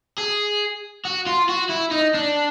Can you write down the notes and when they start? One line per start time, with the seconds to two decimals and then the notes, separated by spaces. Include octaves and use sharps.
0.18 G#4
1.05 F#4
1.26 F4
1.49 F#4
1.70 E4
1.91 D#4
2.14 D4